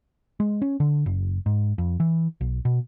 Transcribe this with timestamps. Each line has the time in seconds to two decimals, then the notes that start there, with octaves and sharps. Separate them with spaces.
0.40 G#3
0.62 C#4
0.80 D3
1.06 F#1
1.46 G#2
1.78 F2
2.00 E3
2.41 B1
2.65 B2